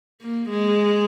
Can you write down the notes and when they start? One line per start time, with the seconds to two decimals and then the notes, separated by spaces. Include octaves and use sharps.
0.22 A#3
0.50 G#3